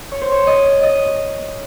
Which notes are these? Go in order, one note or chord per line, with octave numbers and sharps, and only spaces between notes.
C#5
C5
C#5
D#5
D#5